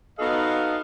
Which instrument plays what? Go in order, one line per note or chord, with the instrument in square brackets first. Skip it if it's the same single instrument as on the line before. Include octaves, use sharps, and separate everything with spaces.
[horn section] B3 D#4 F#4 A4 D#5 F5